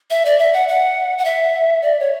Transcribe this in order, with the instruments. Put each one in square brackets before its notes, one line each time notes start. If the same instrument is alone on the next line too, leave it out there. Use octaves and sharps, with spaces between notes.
[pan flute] E5
D5
E5
F#5
F#5
F#5
E5
D5
C#5